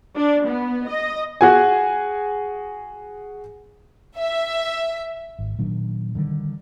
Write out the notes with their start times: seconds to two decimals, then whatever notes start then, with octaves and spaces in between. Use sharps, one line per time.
0.16 D4
0.46 B3
0.89 D#5
1.41 F#4 G#4 G#5
4.18 E5
5.39 G#1
5.58 A#2 D#3 F#3 D4
6.15 D3 D#3 G3